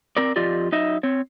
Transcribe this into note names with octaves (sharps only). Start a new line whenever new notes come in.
C4 A#4 D5
F2 F4 G4 D5 D#5
F#3 D#4 D#5 E5
C4 C#5